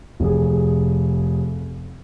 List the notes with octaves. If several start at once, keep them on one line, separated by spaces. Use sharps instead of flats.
F1 G#4